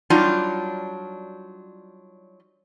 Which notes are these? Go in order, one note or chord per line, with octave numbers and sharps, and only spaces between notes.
F#3 G3 D4 D#4 F4